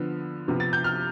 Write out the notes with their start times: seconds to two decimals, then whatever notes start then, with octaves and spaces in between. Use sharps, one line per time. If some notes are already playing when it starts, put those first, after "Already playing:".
Already playing: D3 F3 B3
0.48 C3 F3 B3
0.60 A6
0.73 G6
0.84 F6